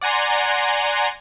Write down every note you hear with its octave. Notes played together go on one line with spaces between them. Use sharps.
D5 F#5 G#5 A#5 C6